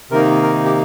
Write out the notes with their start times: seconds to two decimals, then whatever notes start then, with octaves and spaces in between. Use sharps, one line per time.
0.10 C3 D#3 A#3 D#4 A#4
0.43 A#4
0.65 G4